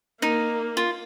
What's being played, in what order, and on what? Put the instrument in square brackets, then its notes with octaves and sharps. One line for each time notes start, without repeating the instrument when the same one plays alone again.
[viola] A#3 [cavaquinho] D#4
[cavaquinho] F4